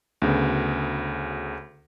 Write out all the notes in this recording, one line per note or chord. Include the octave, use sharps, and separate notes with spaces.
D2 C#3 B3